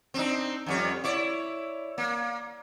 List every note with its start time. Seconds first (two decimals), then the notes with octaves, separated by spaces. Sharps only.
0.14 C4 D4 D#4
0.67 F2 G3 C#5
1.04 E4 C#5 D5
1.98 A#3